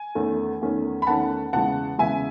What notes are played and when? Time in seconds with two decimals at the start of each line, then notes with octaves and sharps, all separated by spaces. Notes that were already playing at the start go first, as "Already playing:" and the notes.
Already playing: G#5
0.15 E2 D#3 A3 C#4
0.62 E2 D#3 A3 C#4
1.02 B5
1.07 E2 D#3 A3 C#4 F#5 A5
1.53 E2 C#3 E3 G#3 F#5 A5
1.98 E2 C#3 E3 G#3 E5 G#5